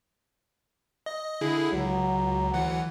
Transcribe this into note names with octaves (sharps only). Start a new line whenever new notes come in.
D#5
D3 E4 G#4
C#2 F#3
D2 E3 F#5